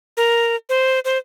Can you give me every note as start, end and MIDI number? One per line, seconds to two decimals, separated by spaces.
0.17 0.56 70
0.69 1.00 72
1.05 1.18 72